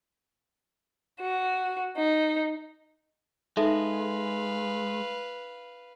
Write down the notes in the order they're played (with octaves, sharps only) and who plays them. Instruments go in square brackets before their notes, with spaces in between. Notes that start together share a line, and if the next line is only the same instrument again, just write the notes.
[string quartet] F#4
D#4
[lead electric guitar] G#3 [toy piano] D#4 A4 E5 [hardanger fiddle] B4 F5